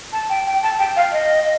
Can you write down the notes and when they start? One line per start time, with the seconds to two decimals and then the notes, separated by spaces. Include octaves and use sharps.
0.12 A5
0.29 G5
0.46 G5
0.63 A5
0.79 G5
0.96 F5
1.12 D#5